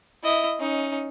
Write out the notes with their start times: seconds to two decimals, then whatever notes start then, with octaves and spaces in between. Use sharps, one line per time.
0.24 E4 D#5
0.59 C#4 D#4